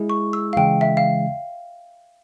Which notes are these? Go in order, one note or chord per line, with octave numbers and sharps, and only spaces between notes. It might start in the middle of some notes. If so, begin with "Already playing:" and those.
Already playing: G#3 E4 G#4
C#6
E6
F5
C#3 E3 G#3 G5
E5
F5